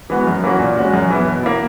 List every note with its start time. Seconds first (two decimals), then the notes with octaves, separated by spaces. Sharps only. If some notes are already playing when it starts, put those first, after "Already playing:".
0.10 E3 G#3 B3 F#4
0.27 F#2
0.44 E3 A#3 C#4 F#4
0.60 A#2
0.77 G#3 C#4 F#4
0.93 F#2
1.10 E3 B3 E4
1.27 B2
1.43 A#3 E4